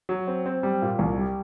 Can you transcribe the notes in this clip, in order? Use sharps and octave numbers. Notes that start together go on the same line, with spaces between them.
F#3
C4
C4
G3
A#2
C2
G3